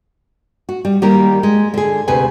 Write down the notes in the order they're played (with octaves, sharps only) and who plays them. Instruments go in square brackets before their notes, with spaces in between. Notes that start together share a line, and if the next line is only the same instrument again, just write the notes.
[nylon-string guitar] F#4
G3
D#3 G3 A#3 D#4 A#4
G#3
D3 G#4
D2 C3 B4 G#5